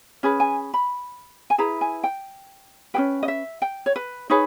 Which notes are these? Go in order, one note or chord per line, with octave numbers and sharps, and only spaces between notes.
C#4 G#4 B4
G#5
B5
G#5
E4 G#4 B4 A#5
G#5
G5
C#4 G#4 B4 G5
D#5
E5
G5
C#5
B4
D#4 G#4 B4 C#5